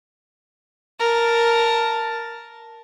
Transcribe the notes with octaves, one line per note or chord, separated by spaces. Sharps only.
A#4 A5